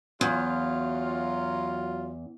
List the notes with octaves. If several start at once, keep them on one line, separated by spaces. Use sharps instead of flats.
E2 F#3 F4